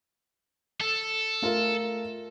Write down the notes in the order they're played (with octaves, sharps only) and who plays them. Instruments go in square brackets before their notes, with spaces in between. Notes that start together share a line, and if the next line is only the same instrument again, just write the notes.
[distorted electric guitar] A4
[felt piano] A3 F4 A#4